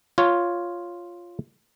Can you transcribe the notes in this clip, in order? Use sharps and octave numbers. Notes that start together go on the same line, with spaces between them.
F4 C#5